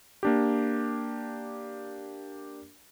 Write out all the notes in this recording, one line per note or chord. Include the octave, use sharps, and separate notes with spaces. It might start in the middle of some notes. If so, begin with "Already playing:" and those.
A#3 D4 G4